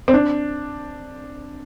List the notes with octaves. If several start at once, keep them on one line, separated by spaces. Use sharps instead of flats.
C4
D4